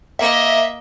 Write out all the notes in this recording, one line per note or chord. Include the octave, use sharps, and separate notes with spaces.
A#3 D#5 E5